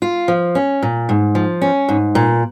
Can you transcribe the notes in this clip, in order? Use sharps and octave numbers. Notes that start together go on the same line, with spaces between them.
F4
F3
C#4
A#2
G#2
F3
C#4
G#2
A#2